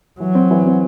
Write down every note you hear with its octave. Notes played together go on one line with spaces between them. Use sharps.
E3 F#3
C4
E3
C4